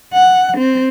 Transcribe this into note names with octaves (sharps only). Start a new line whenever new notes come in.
F#5
C4